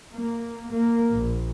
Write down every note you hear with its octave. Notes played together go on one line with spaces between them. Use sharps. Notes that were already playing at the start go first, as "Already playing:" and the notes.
A#3
A#3
A#1